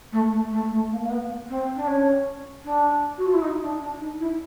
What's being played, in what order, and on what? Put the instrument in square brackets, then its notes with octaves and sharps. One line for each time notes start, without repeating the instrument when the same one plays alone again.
[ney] A3
A3
A3
A3
A#3
A#3
B3
C4
D4
C#4
D4
F#4
F4
E4
D#4
D4
D4
D#4
E4